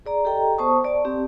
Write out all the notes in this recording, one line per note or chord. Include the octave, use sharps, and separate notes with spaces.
G#4 D5 A#5
G4 A4 D#5 G5 A#5
B3 C5 A5 C#6 D#6
D5 A5
C4 G4